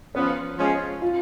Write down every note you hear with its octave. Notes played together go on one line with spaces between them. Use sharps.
F3 B3 C#4 F4
F3 G#3 C#4 F4 G#4
F4